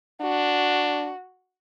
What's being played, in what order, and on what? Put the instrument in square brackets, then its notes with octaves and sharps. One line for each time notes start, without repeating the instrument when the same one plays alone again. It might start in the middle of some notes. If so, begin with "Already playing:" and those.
[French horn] D4 [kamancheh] F#4